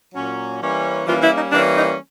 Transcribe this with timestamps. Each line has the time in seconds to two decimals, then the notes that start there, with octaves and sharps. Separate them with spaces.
0.15 A#2 F#3 A#3 C#4
0.61 E3 G3 A#3 C#4
1.06 E3 F3 G3 A#3 C#4 F4
1.22 E3 E4
1.37 D#4
1.52 E3 G3 A#3 C#4 D4
1.75 D#4